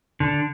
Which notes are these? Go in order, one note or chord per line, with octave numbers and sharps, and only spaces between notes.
D3